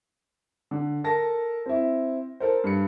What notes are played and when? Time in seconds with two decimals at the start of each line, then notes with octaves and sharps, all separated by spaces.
0.71 D3
1.04 A4 A#4 A5 A#6
1.66 C4 E4
2.40 A4 A#4 C5
2.64 G2 C#7